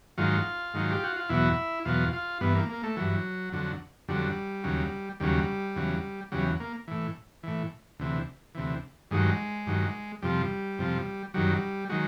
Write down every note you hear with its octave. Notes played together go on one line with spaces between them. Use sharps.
G#2 D#3 F#3 F4
G#2 D#3 F#3
G4
F#4
F4
E2 B2 F#3 E4
E2 B2 F#3 F4
F4
G2 E3 B3
A#3
A#3
A3
G2 E3 F#3
F2 D3 F#3
F2 D3 F#3 G3
D#2 C#3 F#3
D#2 C#3 F#3 G3
E2 C#3 F#3
E2 C#3 F#3 G3
A#3
A2 E3
A2 E3
D2 C3 E3
D2 C3 E3
G2 D#3 F#3 G#3
G2 D#3 F#3
F2 C3 F3 G3
F2 C3 F3
F#2 D#3 F#3 G3
D#3 F#3 G#3